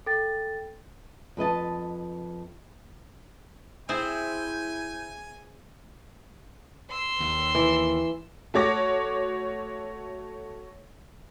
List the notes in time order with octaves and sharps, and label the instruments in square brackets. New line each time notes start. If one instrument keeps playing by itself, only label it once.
[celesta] A4 G5 A6
[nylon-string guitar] F2 B4 D#5 A5
[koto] C4 G#4 C5 [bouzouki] E4 [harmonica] G#5 [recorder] G6
[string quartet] C6 E6
[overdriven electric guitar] D#2
[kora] E3
[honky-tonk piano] A3 F#4 C#5 D6 A#6